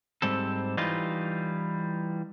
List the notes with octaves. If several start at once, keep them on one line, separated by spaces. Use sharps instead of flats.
G#2 G3 C4 A4
E3 G3 D#4 F4